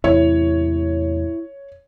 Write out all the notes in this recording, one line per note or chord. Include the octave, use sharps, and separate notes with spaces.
E2 A2 C3 E4 C#5